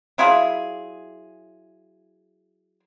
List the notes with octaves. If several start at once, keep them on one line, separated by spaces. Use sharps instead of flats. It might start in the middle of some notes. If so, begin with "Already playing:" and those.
F#3 E4 F4 G#4